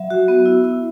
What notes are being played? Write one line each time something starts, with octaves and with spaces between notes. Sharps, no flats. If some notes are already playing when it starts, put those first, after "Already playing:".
Already playing: F#3 E5
F#4
B3
E4
E4